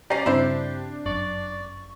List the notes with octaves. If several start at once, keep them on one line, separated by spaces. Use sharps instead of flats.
F#3 C#4 G4 D5 A#5 C7
G2 C#3 C4 D4 E4 C5
G1 F#2 D5 C#6